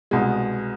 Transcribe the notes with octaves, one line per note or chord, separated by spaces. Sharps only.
C2 B2 G#3